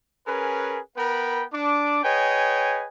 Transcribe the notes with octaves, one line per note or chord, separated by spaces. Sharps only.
C#4 G#4 A#4 B4
B3 A#4 B4 G5 B5
D4 D6
G#4 B4 C#5 D#5 G5 G#5